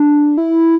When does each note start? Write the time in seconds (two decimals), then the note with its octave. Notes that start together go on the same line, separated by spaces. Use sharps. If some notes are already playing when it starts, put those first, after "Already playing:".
Already playing: D4
0.37 E4